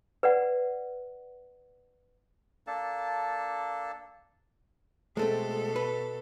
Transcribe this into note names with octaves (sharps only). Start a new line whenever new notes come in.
B4 D5 F#5
A#3 D4 A4 A5
B2 G#3 A3 C4 A4
B4